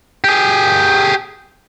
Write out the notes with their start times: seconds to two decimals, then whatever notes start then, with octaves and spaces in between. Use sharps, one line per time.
0.24 G4 G#4